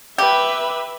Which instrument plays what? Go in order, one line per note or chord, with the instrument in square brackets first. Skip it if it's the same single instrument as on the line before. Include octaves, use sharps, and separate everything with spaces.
[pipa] G4 [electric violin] B4 E5